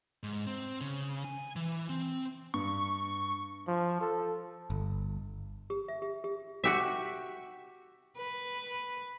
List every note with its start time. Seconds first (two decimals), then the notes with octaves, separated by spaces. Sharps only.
0.23 G#2
0.47 C4
0.81 C#3
1.24 G#5
1.56 E3
1.89 C4
2.54 G2 C#6
3.68 F3
4.01 A4
4.70 G1
5.70 G4
5.88 E5
6.02 G4
6.24 G4
6.64 F#4 G4 E5
8.17 B4